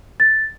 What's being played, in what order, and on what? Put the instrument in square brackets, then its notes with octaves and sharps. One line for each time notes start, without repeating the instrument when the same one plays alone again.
[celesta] A6